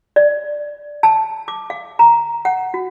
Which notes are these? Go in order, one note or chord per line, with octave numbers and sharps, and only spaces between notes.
D5
A5
D6
F5
A#5
F#5
F#4